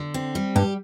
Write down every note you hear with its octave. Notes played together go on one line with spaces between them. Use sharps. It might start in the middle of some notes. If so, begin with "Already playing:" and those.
Already playing: D3
C4
G3
G2 G4